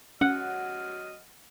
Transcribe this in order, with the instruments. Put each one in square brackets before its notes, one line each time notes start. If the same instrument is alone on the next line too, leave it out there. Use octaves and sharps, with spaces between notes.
[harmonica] F#3 D#5 F6 [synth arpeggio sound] C#4 [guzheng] F#5